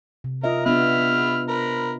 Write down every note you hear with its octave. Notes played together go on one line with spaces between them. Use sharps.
C3
F4 A#4 D#5 E5
B3 D4 F4 E5 B5 F6
A#4 B5